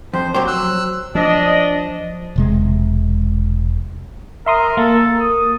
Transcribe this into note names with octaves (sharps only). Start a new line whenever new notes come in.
F2 C5
F#3 G4 C5
E6 F#6
F3 D4 D#5
E1 C3 G#3
A#4 E5 C6 D#6
A#3 A4
D#6